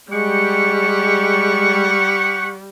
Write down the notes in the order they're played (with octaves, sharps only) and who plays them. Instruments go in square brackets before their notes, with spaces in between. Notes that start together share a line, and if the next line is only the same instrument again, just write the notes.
[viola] G3 [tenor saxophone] G#3 [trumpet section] G4 F#5 C#6